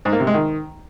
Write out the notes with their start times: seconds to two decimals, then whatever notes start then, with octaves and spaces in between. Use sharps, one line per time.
0.05 G#2
0.13 A#3
0.20 C3
0.27 G#3
0.34 D#3